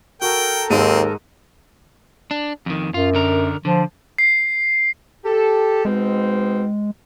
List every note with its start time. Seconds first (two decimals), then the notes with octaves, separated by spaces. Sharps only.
0.22 F#4 A4 A#4 G5
0.70 D#2 G#2 G#3 C4 D#7
2.31 D4
2.66 F2 D#3
2.94 F#2 F4
3.15 D3 A#4
3.65 D3 F3
4.18 C7
5.25 G4 A4
5.85 G#2 B2 G#3 C4